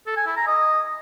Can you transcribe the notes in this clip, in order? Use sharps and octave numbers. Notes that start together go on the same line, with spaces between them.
A4
G#5
E4
A#5
D#5